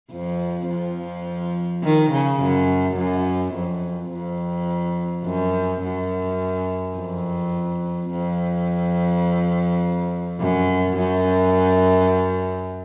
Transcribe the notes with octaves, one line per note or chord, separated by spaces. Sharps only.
F2 F3
F2 F3
D#3
C#3
F#2
F#2
F2
F2
F#2
F#2
F2
F2
F#2
F#2